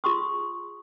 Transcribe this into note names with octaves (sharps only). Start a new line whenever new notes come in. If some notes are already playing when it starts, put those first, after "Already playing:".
F4 G#4 C6 C#6 D#6